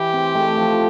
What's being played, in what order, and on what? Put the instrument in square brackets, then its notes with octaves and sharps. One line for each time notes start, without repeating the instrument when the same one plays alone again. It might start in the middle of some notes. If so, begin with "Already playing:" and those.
Already playing: [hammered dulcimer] E3 [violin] G4
[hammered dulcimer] C4
A3
F3